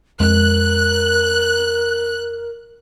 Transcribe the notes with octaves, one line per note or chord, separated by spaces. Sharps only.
F2 G#3 A#4 F#6